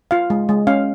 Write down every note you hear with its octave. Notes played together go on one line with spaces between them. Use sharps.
F4 F5
G#3
G#3
C#4 F5